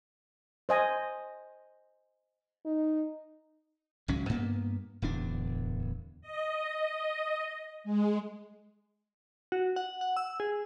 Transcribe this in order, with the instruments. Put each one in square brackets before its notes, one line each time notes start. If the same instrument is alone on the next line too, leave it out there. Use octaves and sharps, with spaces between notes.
[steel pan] C5 D#5 G#5
[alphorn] D#4
[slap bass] G#1 C#2 F#3 C#4
G2 A#3 B3
D1 E2 D4
[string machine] D#5
G#3
[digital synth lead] F#4
F#5
F#5
E6
G#4